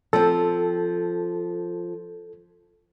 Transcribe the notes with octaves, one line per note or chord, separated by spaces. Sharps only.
F3 C4 A4